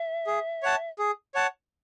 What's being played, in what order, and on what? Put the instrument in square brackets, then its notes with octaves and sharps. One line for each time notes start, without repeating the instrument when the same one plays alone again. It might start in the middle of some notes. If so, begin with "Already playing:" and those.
Already playing: [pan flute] E5
[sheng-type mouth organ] G#4
C#5 F#5 A5
G#4
C#5 F#5 A5